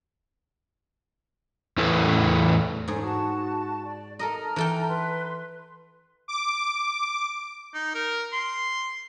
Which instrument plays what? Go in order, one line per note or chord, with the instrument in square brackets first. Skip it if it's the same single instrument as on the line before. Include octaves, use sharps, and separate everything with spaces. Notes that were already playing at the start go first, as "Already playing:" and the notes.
[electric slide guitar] E2 A2 E4 A4 B4
[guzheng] G#2 G#4 [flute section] C#4 A4
[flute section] F#4 A5
D5
[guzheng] A4 A#4 D#5 [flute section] A#5 F6
[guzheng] E3 A4 G5
[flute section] B4 C6
[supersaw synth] D6
[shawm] D#4
A#4
C6